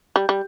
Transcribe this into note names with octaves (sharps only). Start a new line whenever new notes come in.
G3
G3